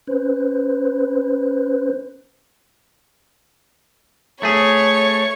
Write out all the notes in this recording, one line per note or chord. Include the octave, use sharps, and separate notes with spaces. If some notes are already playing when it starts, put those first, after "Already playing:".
C#4 B4 C5
A3 G#4 C#5 C#6